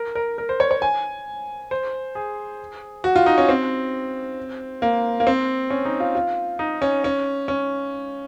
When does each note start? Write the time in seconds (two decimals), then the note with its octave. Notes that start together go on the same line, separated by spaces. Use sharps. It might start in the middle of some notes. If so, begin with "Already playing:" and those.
Already playing: A#4
0.15 A#4
0.38 A#4
0.49 C5
0.60 C#5
0.71 C#5
0.82 G#5
1.71 C5
2.15 G#4
3.04 F#4
3.16 F4
3.26 D#4
3.38 C#4
3.49 C4
4.82 A#3
5.20 A#3
5.27 C4
5.70 C#4
5.85 D#4
6.00 F4
6.15 F4
6.59 D#4
6.82 C#4
7.04 C#4
7.48 C#4